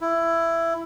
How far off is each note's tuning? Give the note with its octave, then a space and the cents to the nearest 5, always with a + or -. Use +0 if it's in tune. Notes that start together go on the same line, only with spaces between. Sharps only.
E4 +15